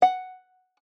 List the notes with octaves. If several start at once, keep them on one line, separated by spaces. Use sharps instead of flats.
F#5